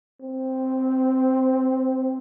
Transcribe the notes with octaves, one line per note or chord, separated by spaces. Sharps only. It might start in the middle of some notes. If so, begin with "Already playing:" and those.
C4